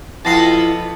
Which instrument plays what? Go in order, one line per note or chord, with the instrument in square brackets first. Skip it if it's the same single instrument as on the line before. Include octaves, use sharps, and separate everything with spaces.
[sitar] F2 B3 F4 [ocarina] E4 [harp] A5 A#6 C7